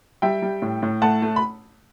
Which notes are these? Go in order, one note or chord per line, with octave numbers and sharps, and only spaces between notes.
G3 E5 G5
G3
A2
A2
A3 F#5 A5
A3
B5